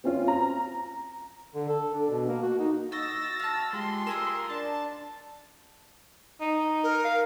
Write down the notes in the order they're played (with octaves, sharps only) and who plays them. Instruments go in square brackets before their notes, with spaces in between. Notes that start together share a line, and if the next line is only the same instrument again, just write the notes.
[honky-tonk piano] C4 C#4 F4
A#5
[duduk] D3
A4
D4
B2
A#3
F#4
D#4
[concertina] F#4 [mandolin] D#5 [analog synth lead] E6 [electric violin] A6 A#6
[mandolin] F5 A5
[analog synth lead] G#3 [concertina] F4 G4 [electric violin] C6
[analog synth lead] A#4 [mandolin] D#5 G#5 E6
[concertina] D4 [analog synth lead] A5
[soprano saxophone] D#4
[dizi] A#4
[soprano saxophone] F5